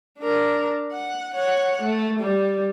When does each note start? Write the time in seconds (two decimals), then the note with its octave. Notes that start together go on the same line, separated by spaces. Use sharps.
0.20 D4 A#4
0.92 F#5
1.35 C#5 F#5
1.83 A3
2.21 G3